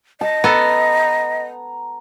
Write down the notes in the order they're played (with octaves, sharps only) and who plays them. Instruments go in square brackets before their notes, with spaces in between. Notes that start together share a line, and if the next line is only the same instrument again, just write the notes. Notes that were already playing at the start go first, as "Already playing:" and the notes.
[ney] D#5 [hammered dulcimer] A5
[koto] B3 A4 [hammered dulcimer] A#5